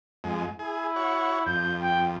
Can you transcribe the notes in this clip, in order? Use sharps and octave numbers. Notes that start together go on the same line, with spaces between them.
F2 G#3
E4 G#4
F#4 C#5
F2 G6
G5